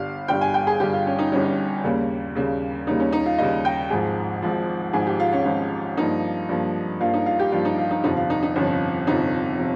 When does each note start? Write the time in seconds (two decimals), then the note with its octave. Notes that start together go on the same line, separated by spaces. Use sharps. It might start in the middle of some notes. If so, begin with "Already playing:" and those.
Already playing: G1 G2 G3 F5
0.28 G1 G2 G3 G5
0.41 G#5
0.54 G5
0.67 G#4
0.80 G1 G2 G3 G4
0.93 F4
1.06 C#4
1.19 D#4
1.32 G1 G2 G3 C#4
1.84 D#2 C#3 G3 A#3
2.35 D#2 C#3 G3 A#3
2.87 D#2 C#3 G3 A#3 D#4
3.00 C#4
3.13 D#4
3.26 F4
3.38 D#2 C#3 G3 A#3 D#5
3.65 G5
3.90 G#1 G#2 F3 G#4
4.42 G#1 G#2 F3
4.93 G#1 G#2 F3 G#4
5.07 G4
5.20 F4
5.33 C#4
5.45 G#1 G#2 F3
5.97 G2 F3 A#3 D#4
6.49 G2 F3 A#3
7.00 G2 F3 A#3 F4
7.14 D#4
7.26 F4
7.39 G4
7.52 G2 F3 A#3 F4
7.65 D#4
7.78 F4
7.91 D#4
8.04 G1 F2 C3 F3 D#4
8.17 F4
8.30 D#4
8.43 D#4
8.56 G1 F2 C3 F3 C#4
9.07 G1 F2 C3 F3 D#4
9.59 C3 F3